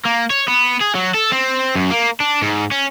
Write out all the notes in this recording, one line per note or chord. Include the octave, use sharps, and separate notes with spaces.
A#3
C#5
B3
G#4
F#3
A4
C4
F#2
A#3
D4
G#2
C#4